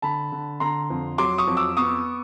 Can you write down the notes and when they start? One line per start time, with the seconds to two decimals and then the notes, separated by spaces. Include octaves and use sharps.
0.02 D3 A5 B5
0.32 D3
0.60 D3 A#5 C6
0.90 F2
1.18 F#3 C6 D6
1.38 C#6 D#6
1.47 F2
1.57 D6 E6
1.77 B3 C#6 D#6